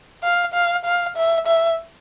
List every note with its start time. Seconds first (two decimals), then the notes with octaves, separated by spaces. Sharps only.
0.23 F5
0.54 F5
0.85 F5
1.17 E5
1.47 E5